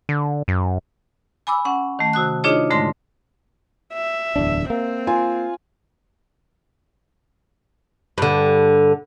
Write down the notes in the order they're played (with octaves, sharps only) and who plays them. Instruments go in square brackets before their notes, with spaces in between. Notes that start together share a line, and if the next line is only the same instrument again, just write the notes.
[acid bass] D3
F#2
[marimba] G#5 B5 D6 E6
C#4 F#5
D#3 A3
C3 F#4 D#6 F#6
D4 D#4 F4 G#4 C#5 D#5
G#2 D3 G#3 A3 C6 A#6
[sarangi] E5
[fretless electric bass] D1 E2 D4
[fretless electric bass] A#3 [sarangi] C4
[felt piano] F4 G#5
[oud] G2 D3